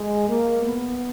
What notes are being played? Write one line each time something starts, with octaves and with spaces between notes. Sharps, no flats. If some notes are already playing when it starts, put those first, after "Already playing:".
Already playing: G#3
A#3
B3